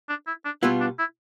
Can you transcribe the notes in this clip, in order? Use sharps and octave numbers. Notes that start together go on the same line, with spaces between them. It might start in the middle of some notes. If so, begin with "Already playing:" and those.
D4
E4
D4
B2 G3 B3 E4 F4
D4
E4